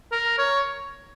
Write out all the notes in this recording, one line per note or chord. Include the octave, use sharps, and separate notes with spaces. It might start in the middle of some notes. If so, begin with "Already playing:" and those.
A#4
C#5